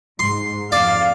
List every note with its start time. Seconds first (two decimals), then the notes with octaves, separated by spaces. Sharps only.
0.19 G#2 C6
0.72 F2 D5 F5